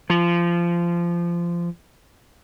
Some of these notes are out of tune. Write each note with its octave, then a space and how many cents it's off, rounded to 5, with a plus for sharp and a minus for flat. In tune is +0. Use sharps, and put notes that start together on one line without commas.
F3 -20